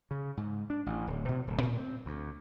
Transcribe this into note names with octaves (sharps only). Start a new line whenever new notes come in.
C#3
G#2
D4
A1
D1
B2
D1
A2
C4
D2